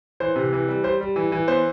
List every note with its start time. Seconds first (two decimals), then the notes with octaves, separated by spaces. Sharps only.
0.20 E3 C5
0.36 C3
0.53 E3
0.68 G3
0.84 G3 C5
1.01 G3
1.16 E3
1.32 E3
1.48 B3 C5